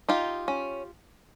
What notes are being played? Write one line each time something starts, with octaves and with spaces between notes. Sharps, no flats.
D#4 F4 G4
C#4